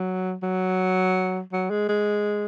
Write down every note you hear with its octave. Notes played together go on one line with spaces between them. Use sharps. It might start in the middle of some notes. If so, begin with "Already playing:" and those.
Already playing: F#3
F#3
F#3
G#3
G#3